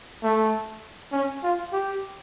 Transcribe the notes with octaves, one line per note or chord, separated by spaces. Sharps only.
A3
C#4
F4
G4